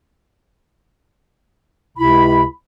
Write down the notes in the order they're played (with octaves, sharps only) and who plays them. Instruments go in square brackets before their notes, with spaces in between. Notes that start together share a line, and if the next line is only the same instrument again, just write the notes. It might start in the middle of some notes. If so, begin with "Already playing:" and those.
[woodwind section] C#2 C3 E4 B5